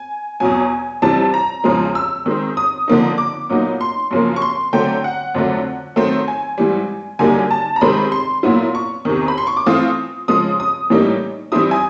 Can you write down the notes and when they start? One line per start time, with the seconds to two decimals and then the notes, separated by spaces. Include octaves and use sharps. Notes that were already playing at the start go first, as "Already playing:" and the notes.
Already playing: G#5
0.40 E2 B2 F#3 G#5
1.02 F2 C3 E3 G3 A5
1.34 A#5
1.64 E2 C#3 F3 G#3
1.95 E6
2.26 D#3 G#3 C4
2.57 D#6
2.88 D3 F3 A#3 D#4
3.18 D6
3.49 A#2 F#3 B3 D#4
3.81 C6
4.11 F#2 C#3 F3 A#3
4.36 C#6
4.42 C6
4.73 D3 F#3 A3 C4 G5
5.04 F#5
5.35 F2 D3 F#3 A3
5.96 D#3 F#3 A3 C4
6.28 G#5
6.58 G#2 E3 G3
7.19 F#2 D3 G3 A#3 D#4 G#5
7.51 A5
7.76 A#5
7.81 C3 D#3 G#3 C4 B5
8.12 C6
8.43 A#2 F#3 B3 E4
8.75 C#6
9.05 E2 C3 D#3
9.28 B5
9.38 C6
9.47 C#6
9.57 D6
9.66 E3 A3 C4 F4 D#6
10.28 C#3 F3 G#3 D#6
10.60 D#6
10.90 A2 E3 G3 A#3 D#4
11.52 E3 G3 C4 E4 D#6
11.71 G#5